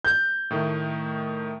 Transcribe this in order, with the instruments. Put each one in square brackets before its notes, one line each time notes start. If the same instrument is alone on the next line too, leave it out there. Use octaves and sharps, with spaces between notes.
[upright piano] G6
[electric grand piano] A2 D#3 A3